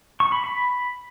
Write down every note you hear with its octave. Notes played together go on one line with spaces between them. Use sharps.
C#6
B5
B5